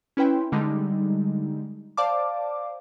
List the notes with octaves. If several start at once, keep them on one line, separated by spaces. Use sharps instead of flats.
C#4 E4 B4 G5 C6
D3 G3 G#3 D#4
C5 D5 F5 A5 D6